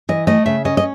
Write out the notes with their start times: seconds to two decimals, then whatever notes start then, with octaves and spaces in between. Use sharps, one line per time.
0.09 E3 D#5
0.27 A3 D#5
0.46 C#3 E5
0.65 C#4 D#5
0.77 D#5